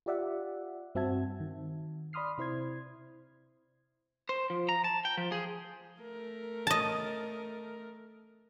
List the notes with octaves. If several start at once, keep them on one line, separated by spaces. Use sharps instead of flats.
F4 G4 D5 E5 F#5
G2 C4 F#4 E5 A5 G#6
D#3
D5 B5 C6 D#6 F6 C7
C3 E4 C5 C6 G#6
C5
F3
A#5
A5
G5
F3
G#4
A3 A#4
D#5 A5